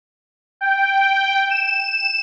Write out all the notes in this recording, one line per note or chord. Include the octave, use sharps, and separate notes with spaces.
G5
E7